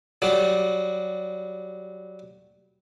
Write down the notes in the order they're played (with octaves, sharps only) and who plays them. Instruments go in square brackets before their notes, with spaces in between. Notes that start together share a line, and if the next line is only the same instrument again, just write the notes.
[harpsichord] F#3 G3